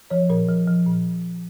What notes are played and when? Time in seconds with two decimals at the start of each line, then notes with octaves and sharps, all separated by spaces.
0.10 F3 C#5
0.30 A#2 A#4
0.49 F3
0.68 F3
0.86 A#2